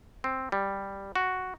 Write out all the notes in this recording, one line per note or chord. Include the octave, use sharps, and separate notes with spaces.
C4
G3
F#4